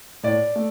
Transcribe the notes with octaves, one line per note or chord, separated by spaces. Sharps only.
A2 D5
A3